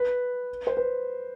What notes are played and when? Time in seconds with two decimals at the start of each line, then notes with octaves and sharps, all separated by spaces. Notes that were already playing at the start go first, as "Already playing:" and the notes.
Already playing: B4
0.67 C5
0.77 B4